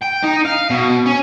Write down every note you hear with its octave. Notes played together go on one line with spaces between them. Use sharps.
G5
D#4
F5
B2
C#4